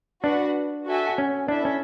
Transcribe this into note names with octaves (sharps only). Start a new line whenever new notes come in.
D4 F#4 B4 F#5
F#4 A4 E5 G#5
C#4
D4 E4 A4 E5
C#4